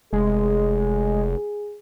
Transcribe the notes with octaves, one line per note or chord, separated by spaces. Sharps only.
F1 G#3 G#4